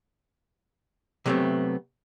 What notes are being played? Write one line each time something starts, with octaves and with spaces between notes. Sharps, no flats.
C3 F#3 G3 A3 B3 C4